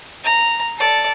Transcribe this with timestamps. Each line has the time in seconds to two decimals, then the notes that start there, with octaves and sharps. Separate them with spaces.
0.24 A#5
0.78 A4 D5